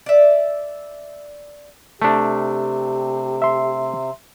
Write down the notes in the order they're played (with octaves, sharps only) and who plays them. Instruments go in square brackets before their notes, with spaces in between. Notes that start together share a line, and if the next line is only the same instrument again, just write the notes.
[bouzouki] D5 E5
[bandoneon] C3 [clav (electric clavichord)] A3 D4 [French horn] G4
[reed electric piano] E5 C6